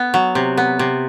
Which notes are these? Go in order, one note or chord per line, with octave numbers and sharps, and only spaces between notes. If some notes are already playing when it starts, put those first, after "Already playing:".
Already playing: B3
F#3
C3
B3
C3